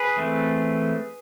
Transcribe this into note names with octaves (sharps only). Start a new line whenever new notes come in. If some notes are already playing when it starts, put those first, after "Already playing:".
Already playing: G#4 B4
E3 A3 C4